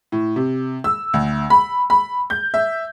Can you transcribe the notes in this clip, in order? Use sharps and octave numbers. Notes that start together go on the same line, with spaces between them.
A2
C3
E6
D2
B5
B5
G6
E5